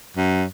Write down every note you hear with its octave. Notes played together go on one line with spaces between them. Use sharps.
F#2